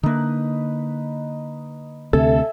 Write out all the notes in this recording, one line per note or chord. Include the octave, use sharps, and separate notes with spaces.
D3 A#3 D#4 B4
D2 C3 A4 E5 G#5